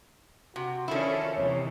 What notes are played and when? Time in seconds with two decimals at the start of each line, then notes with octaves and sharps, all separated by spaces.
0.56 C3 F#4
0.88 D#3 F3 C#4 D4 E4 A4
1.36 D#2 C3 E3 C#5